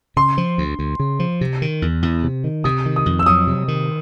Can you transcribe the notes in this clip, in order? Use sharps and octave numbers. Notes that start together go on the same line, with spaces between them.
C#3 C6
F3
D2
D2
C#3
F3
C3
D#3
E2
E2
C3
D#3
C3 D#6
D#3
D#6
F2
E6
F#3 D#6
C3
D#3